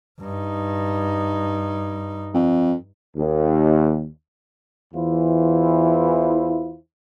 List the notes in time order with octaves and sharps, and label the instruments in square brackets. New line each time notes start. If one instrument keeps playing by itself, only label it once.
[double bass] G2 D#4
[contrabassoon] F2
[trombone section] D#2
E2 E3 E4 F4 C5